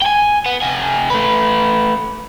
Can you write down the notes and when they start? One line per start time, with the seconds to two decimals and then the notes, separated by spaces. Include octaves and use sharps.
0.02 G5 G#5
0.46 B3
0.62 C3 G#5
1.10 A3 B4